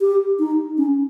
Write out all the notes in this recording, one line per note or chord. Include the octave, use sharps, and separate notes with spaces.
G4
D#4
C#4